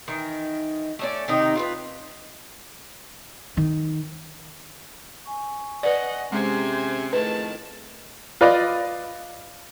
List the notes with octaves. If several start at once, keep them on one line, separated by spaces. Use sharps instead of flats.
D#3 E3
A3 C#4 D5
C3 D#3 D#4
F4 A4 B4
D#3
G#5 C#6
B4 D5 D#5 F#5
C3 G#3 C#4 G#4 C5 G#5
F2 A2 D#3 A3 G#4 A#4 B4 A5
F4 B4 D5 D#5 F5